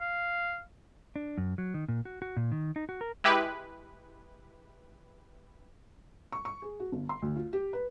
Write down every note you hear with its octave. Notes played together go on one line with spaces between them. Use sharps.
F5
D4
F#2
F#3
D#3
A#2
F#4
F#4
A#2
D#3
D#4
F#4
A#4
G#3 E4 G4 B4
C#6
C#6
G#4
F#4
G1
C6
D2
F4
G4
B4